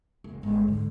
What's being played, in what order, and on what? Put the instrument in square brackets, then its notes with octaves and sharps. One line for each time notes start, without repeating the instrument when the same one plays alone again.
[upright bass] F#1
[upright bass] G1 [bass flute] G#3
[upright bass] G#2 [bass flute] D3